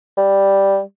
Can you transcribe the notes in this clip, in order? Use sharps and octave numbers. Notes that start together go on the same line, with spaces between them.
G3